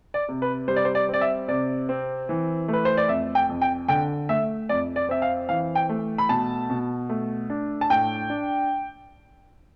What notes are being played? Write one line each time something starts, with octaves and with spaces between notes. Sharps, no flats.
D5
C3
B4
G3 C5
D5
C5
D5
C4 D5
E5
C3 D5
C4
E3
A3 B4
C5
D5
F2 E5
G5
F2
G5
D3 G5
A3 E5
F2 D5
D5
C4 E5
F5
E3 F5
G5
A3
B5
B2 A5
B2
A3
D4
A5
A2 G5
D4